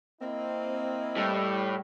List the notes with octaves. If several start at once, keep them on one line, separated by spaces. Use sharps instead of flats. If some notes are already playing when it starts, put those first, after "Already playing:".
A#3 C4 E4 D#5
A2 G3